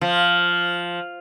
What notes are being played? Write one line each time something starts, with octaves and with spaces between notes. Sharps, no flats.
F3